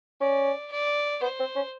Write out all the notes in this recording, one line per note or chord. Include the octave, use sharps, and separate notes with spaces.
C#4 D5
D5
B3 C5
C4
C#4